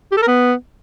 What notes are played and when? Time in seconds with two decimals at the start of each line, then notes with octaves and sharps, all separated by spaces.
0.12 G4
0.17 A4
0.22 A#4
0.27 B3